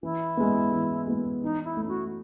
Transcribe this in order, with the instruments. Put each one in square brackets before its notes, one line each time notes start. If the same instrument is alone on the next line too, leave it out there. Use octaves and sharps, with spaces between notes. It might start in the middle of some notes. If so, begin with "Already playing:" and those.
[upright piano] E3 [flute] E4
[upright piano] G#3 B3
E3
G#3 B3
[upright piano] E3 [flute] D#4
[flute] E4
[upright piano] A3 C#4
[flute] F#4